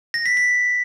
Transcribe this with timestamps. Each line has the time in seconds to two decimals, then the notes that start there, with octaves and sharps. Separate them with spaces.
0.14 A#6
0.26 B6
0.37 B6